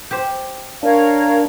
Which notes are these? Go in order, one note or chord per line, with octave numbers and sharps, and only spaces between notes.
G4 C5
D4 A#4 C#5 F5